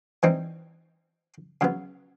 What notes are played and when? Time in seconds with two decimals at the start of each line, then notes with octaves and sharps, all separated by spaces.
0.23 E3 G3 C4 D#4
1.61 C#3 F#3 B3